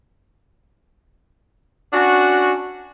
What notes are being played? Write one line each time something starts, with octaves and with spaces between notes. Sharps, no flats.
C#4 D4 F#4